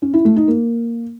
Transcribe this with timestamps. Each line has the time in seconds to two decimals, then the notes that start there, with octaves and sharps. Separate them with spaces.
0.02 C#4
0.14 E4
0.25 A3
0.36 D#4
0.48 A#3